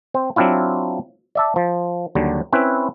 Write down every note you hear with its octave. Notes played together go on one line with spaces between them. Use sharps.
C4 C5
F#3 C4 D4 E4 F4
D5 E5 A5
F3
D#2 D3 F#3 G3
C4 C#4 E4 B4